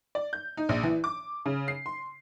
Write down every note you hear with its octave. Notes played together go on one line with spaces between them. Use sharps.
D5
G6
D#4
A#1
E3
D6
C#3
C7
C6